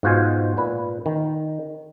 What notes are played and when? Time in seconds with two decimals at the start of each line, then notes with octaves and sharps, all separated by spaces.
0.03 G#2 B2 F4 F#4 C5 G#5
0.57 A#2 B4
1.06 D#3